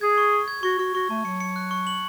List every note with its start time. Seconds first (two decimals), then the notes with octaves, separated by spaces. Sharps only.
0.01 G#4 G#6
0.18 C#6
0.33 C#6
0.48 G#6
0.63 F#4 C#6
0.79 F#4 C#6
0.94 F#4 C#6
1.10 A3 A5
1.25 F#3 C#7
1.40 C#7
1.56 F#6
1.71 C#6
1.87 F#7